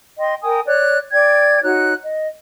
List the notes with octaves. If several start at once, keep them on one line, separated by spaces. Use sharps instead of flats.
D#5 G5 C6
A#4 G5 G#5 D#6
C#5 D5 F#6
D5 G5 G#6
D#4 F#4 C#5 F#6
D#5